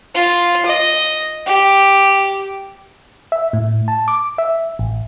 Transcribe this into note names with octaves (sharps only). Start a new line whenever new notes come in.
F4
D#5
G4
E5
A2
A5
D6
E5
A1